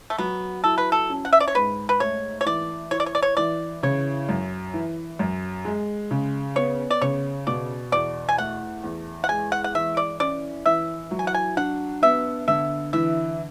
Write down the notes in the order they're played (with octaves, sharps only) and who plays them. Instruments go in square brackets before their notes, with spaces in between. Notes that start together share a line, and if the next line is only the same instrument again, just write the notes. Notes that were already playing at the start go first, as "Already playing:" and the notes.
[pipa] A3
[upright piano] F#3 [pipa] B3
[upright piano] E4 [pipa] A4
[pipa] B4
A4
[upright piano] C#4
[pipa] F#5
E5
D5
C#5
[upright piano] G#2 [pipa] B4
[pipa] B4
[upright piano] A3 [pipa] C#5
[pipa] C#5
[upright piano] E3 [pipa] D5
[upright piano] E4 [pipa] C#5
[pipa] D5
C#5
D5
C#5
[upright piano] E3 [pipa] D5
[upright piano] C#3 [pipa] C#5
[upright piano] F#2
E3
F#2
G#3
C#3
[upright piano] B3 [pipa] C#5
[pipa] D5
[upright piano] C#3 [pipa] C#5
[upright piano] B2 [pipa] D5
[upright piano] E2 [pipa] D5
[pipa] G#5
[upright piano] A3 [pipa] F#5
[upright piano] E2
[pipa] F#5
[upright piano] G#3 [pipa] G#5
[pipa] F#5
F#5
[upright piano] E3 [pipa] E5
[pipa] D5
[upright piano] C#4 [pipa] D5
[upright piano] E3 [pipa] E5
[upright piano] F#3
[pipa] G#5
F#5
G#5
[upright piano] D4 [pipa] F#5
[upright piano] B3 [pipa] E5
[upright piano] D3 [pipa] E5
[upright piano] E3 [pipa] E5